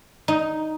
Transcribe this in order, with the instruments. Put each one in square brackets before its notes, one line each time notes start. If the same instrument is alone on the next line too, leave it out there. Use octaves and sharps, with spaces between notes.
[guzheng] D#4